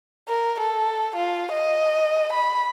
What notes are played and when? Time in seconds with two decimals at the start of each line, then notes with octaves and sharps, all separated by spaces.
0.29 A#4
0.61 A4
1.16 F4
1.52 D#5
2.33 B5